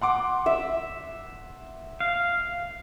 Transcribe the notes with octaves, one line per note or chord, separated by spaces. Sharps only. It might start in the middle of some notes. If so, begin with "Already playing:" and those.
F#5 C6 D6
E5
F5